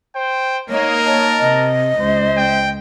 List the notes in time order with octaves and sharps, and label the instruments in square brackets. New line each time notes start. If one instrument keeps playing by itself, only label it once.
[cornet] C5 [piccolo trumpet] G5
[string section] A#3 D#4 D#5 [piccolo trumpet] A#4 [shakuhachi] C#5 [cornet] A#5
[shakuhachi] C#5 [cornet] A5
[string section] C3 [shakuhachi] D#5
[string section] C#2 [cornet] C5
[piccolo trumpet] G5